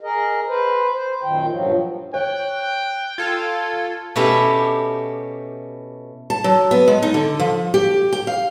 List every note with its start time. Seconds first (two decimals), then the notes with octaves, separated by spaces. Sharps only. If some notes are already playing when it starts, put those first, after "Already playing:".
0.01 G#4 A#4 D#5
0.48 B4 C5
0.93 C5
1.23 F#2 A#2 D#3 G5
1.48 G2 A#2 F3 F#3
2.14 C#5 G5 F#6
3.18 F4 A4 G#6
4.16 B2 A3 C#4 E4 G4
6.30 A5
6.44 F#3
6.71 B3
6.88 G#3
7.02 D#4
7.14 D3
7.40 F3
7.74 G4
8.13 G5
8.27 F5